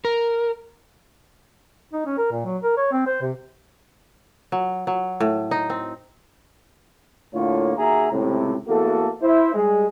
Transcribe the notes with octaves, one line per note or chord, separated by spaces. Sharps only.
A#4
D#4
C#4
A#4
A#2
F#3
A#4
C#5
C4
C5
C3
F#3
F#3
A2
D#4
C4
A2 D3 A#3 F4 C#5
D#2 F#4 G#4 E5 A#5
C#2 A2 C3
E2 A3 A#3 F#4 A4
E4 C5 E5
G3 G#3 G#4